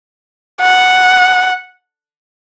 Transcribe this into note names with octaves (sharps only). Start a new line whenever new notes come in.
F#5